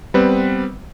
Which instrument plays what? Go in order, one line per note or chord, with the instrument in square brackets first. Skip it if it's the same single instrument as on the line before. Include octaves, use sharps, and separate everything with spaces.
[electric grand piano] G3 B3 C4 B4